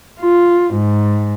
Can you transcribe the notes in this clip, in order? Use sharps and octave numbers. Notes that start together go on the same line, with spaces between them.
F4
G#2